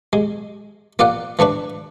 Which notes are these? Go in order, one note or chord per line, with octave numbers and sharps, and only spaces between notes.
G#3
A#3 F4 D5 F#5
E3 A3 D4 B4